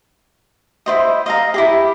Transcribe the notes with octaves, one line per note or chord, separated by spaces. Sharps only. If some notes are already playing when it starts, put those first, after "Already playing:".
E4 F4 C5 D#5
D#5 F5 A#5
E4 G4 G#4